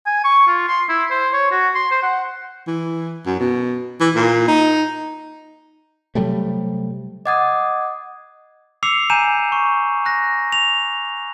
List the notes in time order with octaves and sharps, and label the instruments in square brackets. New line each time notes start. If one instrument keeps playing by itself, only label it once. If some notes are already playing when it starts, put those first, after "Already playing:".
[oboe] G#5
C#6
F4
C6
E4
C5
C#5
F#4
C6
C5
F#5
[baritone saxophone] E3
F#2
B2
E3
A#2
D#4
[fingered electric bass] C3 F#3 G3 A3
[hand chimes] D#5 F#5 D#6 [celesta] D6 G#6 A6
[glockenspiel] D6 E6 C7 C#7 F7
G#5 A#5 G6 D#7 E7
C#6
F#6 A#6
F7